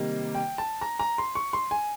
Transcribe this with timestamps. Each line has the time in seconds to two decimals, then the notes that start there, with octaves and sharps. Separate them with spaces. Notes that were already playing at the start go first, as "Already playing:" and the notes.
Already playing: C3 D#3 G3 A#3
0.35 G5
0.58 A5
0.81 A#5
0.99 A#5
1.18 C6
1.35 C#6
1.53 C6
1.71 G#5